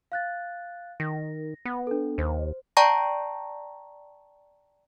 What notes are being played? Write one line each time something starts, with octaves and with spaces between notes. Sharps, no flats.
F5 F#6 A6
D#3 A#6
B3
D4 A4
D#2 C5
D5 G5 A5 A#5 C#6 A#6